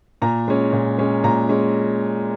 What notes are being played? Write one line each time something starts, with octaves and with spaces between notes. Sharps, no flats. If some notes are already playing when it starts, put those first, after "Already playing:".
A#2 A#5
G#3 C#4
A#2
G#3 C#4
A#2 A#5
G#3 C#4